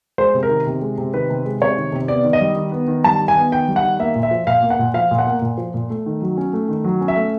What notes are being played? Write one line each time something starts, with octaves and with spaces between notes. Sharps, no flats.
G#3 C5
C3
A#4
D#3
C3
G#3
C3
D#3 B4
C3
G#3
C3 C#5
D#3
C3
B3 D5
D#3
D#5
G3
D#3
B3
D#3
G3 A5
D#3
G#5
B3
D#3 G5
G3
F#5
D#3
A#3 E5
A#2
E5
F3
A#2 F5
A#3
F#5
A#2
F3 F5
A#2
F#5
A#3
A#2
F3
A#2
A3
D#3
F#3
C#4
A3
D#3
F#3
C#4
E5
A3